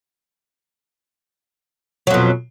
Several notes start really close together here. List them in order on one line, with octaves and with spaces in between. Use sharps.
F#3 F2 B2